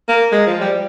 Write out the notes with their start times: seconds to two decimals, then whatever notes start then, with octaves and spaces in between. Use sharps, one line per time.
0.08 A#3
0.32 G#3
0.47 F3
0.61 G3